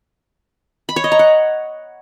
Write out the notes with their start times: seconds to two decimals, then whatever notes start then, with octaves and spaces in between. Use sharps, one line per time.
0.89 B5
0.96 C#5
1.04 D#5
1.12 A#5
1.19 F#5